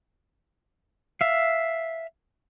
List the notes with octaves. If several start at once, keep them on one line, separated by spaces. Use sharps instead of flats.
E5 F5